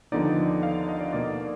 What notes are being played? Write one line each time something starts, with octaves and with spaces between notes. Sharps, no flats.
D#2 D3 F3 B3 D#4 D5
F5
D#5
D5
B2 A#3 D#4 D5